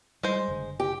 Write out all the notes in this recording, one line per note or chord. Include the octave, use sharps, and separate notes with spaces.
G3 G#3 C5
F#1 D3
G4